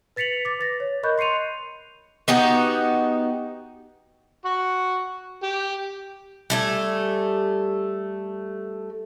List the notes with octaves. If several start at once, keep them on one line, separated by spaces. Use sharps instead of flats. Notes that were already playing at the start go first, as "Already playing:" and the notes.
B4 A6 B6 C#7 F7 F#7
D6 A6
B4 A6 A#6
C#5
A#4 D#5 B5 C#6 F#6 G6
C6 C7 C#7 D#7 F7
B3 D#4 F#4 G4
F#4 C#6
G4
G3 A3 G#5